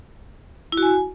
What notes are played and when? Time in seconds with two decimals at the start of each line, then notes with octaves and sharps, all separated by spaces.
0.72 E4
0.77 F#4
0.82 G#5